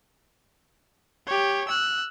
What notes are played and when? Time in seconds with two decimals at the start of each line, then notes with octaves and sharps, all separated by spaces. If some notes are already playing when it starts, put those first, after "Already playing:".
1.27 G4 C#5
1.68 E6 F#6